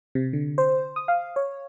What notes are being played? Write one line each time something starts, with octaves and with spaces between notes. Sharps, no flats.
C3
D3
C5
D#6
F5
C#5